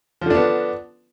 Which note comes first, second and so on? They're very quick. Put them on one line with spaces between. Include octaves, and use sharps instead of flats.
F3 D3 D4 B3